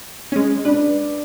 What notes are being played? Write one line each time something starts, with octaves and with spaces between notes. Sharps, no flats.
G#3 C#4
D4 B4